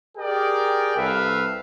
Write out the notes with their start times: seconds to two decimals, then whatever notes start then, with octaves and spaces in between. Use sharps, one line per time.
0.17 G4 G#4 A#4 D5 G5
0.97 C2 A4 B4 E5 F5